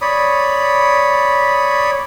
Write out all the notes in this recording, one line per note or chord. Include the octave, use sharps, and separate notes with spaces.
C#5 D5 B5 D#6